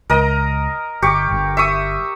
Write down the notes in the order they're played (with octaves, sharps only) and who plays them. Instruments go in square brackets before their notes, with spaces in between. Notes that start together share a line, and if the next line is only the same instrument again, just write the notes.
[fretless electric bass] C#2 [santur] A#4 D#5 A#5
[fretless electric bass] G1 [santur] G4 C#6 D6
[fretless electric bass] G1 G2
[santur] E5 C#6 D#6